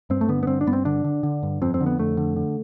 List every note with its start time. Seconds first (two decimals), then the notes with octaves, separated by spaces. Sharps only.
0.10 G2 C4
0.21 A3
0.29 D3 B3
0.43 B3
0.47 G2 C4
0.61 D4
0.67 G2 B3
0.73 C4
0.85 D3 D4
1.04 D3
1.23 D3
1.43 G2
1.62 F2 C4
1.74 C4
1.81 D3
1.86 B3
1.99 F2 A3
2.17 D3
2.36 D3